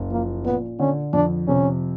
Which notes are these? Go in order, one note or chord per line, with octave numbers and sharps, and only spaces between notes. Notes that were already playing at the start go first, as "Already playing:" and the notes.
Already playing: F#1
F3 A#3
A#2 B3
D3 C#4
F2 D4
C3 C#4